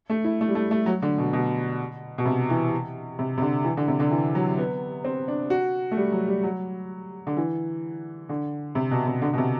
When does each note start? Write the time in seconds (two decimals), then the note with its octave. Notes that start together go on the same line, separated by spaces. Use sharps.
0.10 A3
0.24 E4
0.41 A3
0.48 G3
0.55 A3
0.71 A3
0.86 F#3
1.02 D3
1.18 B2
1.33 B2
2.18 B2
2.25 C3
2.50 E3
3.19 C3
3.38 C3
3.42 D3
3.65 E3
3.77 D3
3.88 C3
4.00 D3
4.11 E3
4.35 F#3
4.58 B3
5.04 C4
5.28 D4
5.50 F#4
5.92 A3
5.97 G3
6.12 F#3
6.28 G3
6.43 F#3
7.27 D3
7.37 E3
8.29 D3
8.75 C3
8.91 B2
9.07 C3
9.22 D3
9.33 B2
9.38 C3